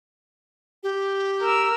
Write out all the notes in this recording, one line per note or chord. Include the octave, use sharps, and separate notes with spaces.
G4
A#4 E6